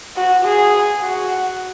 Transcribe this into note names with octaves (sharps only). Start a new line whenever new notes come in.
F#4
G#4
F#4